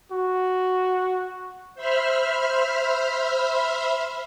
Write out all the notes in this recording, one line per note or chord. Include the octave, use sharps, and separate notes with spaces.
F#4
C5 E5 B5 F6